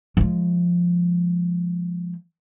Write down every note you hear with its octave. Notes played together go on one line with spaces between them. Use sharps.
F3 G#3